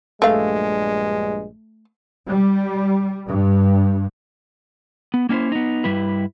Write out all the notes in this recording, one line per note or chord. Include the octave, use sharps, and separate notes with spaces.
A#1 G2 G#3 A3 F5
G3
G2
B3
A#3 C#4 D4 E4 C5
B3 D#4
G2 G3 E4 B4